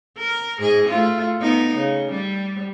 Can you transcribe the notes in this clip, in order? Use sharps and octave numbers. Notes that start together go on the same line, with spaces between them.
A#4
G#2 G#4 D#5
A3 F4
B3 D#4
C#3
G3